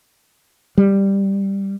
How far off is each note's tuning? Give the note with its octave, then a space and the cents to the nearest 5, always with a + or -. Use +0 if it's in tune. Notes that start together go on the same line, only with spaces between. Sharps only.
G3 +5